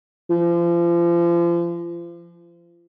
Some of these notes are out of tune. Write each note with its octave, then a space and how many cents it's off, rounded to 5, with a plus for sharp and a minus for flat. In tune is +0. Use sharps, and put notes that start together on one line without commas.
F3 -35